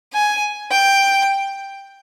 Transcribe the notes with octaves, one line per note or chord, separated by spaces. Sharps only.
G#5
G5